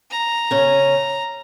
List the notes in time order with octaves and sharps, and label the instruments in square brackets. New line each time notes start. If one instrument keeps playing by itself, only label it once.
[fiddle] A#5
[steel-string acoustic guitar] C#3 C#4